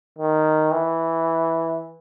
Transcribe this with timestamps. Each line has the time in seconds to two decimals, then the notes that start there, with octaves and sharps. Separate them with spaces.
0.18 D#3
0.72 E3